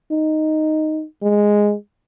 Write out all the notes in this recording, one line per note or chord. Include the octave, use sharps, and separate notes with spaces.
D#4
G#3